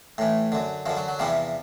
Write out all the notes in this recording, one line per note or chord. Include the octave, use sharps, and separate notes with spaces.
A2 E3
F#2 D3
F#2 D3 F3
F#3
F#3
E2 C3 E3 F3 G3